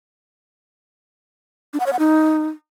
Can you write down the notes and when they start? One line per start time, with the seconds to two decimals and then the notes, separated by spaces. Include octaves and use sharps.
1.74 D4
1.80 F#5
1.86 C#5
1.93 F#5
1.99 D#4